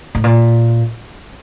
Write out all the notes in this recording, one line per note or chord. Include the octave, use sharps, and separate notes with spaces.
A2
A#2